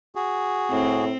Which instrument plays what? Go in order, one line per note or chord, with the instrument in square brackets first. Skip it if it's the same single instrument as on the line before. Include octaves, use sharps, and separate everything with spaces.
[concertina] F#4 G#4
[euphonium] A2 [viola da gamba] C4